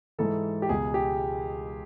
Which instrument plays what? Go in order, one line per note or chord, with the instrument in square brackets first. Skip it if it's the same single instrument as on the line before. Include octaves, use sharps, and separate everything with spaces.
[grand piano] G#2 E3 A4
G4
C#2 B2 G#4
G4